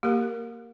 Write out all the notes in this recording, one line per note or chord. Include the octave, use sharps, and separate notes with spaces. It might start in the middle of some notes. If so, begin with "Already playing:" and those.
A#3 G4 A#4